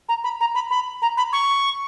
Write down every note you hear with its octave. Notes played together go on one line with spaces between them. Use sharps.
A#5
B5
A#5
B5
B5
A#5
B5
C#6